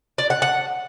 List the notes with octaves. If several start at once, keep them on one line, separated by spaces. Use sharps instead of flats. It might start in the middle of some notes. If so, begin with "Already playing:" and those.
D5
F#5
F#5